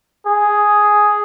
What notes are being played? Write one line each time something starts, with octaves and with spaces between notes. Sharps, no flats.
G#4